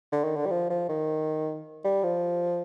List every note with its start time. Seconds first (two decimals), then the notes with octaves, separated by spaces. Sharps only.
0.12 D3
0.24 D#3
0.36 D3
0.46 G3
0.51 F3
0.70 F3
0.89 D#3
1.85 G3
2.04 F3